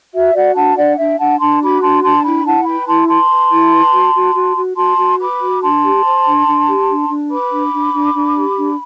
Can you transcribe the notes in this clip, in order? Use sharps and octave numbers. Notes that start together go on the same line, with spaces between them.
F#4 E5
F#4 D5 F#5
D4 F#5 A5
D4 D5 F#5
D4 E5 G5
D4 F#5 A5
D4 A5 C6
F#4 B5 D6
D4 A5 C6
D4 A5 C6
E4 G5 B5
E4 F#5 A5
B4 G5 B5
E4 A5 C6
B4 A5 C6
B4
E4
B4
F#4
F#4
F#4
F#4
F#4 A5 C6
F#4
B4 B5 D6
F#4
D4 A5 C6
G4
C5
D4
D4
G4
D4
D4
B4 B5 D6
D4
D4
D4
D4
G4
D4